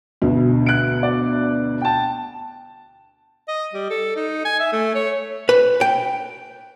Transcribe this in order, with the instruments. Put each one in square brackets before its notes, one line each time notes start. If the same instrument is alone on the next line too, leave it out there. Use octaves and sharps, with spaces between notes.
[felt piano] D2 B2
[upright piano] F#6 D7
D5
G5 A5
[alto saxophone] D#5
G3
A4
D#4
G#5
E5
A3
C#5
[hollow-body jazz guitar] B4
G5